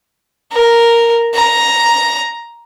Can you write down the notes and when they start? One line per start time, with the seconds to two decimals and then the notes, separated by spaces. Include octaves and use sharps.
0.52 A#4
1.34 A#5